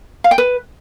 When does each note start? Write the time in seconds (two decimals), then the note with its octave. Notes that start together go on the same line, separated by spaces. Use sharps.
0.24 F5
0.31 G5
0.38 B4